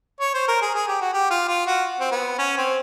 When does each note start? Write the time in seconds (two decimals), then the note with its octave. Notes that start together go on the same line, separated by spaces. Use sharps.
0.20 C#5
0.34 C5
0.48 A#4
0.62 G#4
0.75 G#4
0.88 G4
1.01 F#4
1.13 G4
1.30 F4
1.48 F4
1.67 F#4
2.00 C4
2.12 B3
2.39 C#4
2.57 C4